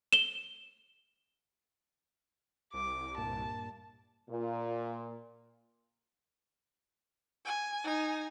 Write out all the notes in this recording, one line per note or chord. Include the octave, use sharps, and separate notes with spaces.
E7 G7
C2 D6
G2 A#2 A5
A#2
G#5
D#4 G#5